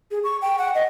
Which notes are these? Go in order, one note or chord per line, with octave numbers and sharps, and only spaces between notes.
G#4
C#6
G5
F#5
D#5